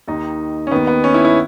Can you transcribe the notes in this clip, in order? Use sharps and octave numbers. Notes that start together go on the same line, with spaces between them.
D#2 D#3 D#4
C#4
D#2 D#3 B3
B3
C#4
E4
E4